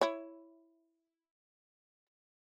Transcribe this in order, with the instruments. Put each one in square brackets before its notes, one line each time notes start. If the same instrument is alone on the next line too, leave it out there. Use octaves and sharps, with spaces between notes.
[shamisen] E4 C#5